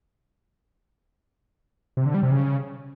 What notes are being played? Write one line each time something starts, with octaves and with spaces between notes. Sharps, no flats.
C3
D3
G3
C3
C#3